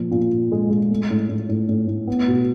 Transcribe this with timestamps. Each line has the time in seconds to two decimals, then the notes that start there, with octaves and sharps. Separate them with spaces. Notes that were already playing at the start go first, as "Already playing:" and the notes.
Already playing: A#2 F3
0.11 A#2
0.32 A#2
0.52 G#3
0.70 G#3
0.91 A3
1.10 A2
1.29 A2
1.49 A2
1.69 A2
1.88 A2
2.07 B3
2.28 B2